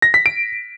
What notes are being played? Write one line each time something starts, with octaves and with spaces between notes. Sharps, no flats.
A#6
B6
D7